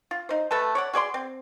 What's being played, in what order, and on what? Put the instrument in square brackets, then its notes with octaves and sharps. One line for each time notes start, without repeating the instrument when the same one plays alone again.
[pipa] F4
D#4 C5
A3 A4 B4 A5
C#5 D5 F#5
F#4 G#4 D5 C6
C4